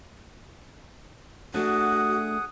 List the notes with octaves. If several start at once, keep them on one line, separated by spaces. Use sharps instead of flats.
A3 D4 F#4 G#4 F#5 D#6